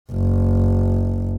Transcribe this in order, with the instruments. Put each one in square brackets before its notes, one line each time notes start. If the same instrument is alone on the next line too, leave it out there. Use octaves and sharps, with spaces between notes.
[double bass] F#1